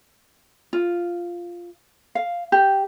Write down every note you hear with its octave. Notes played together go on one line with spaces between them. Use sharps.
F4
F5
G4